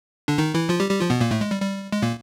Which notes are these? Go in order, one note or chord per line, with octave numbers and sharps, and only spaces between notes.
D3 D4
D#3 D#4
E3 E4
F3 F4
G3 G4
G3 G4
F3 F4
B2 B3
A#2 A#3
A2 A3
G#3
G3
G3
G#3
A#2 A#3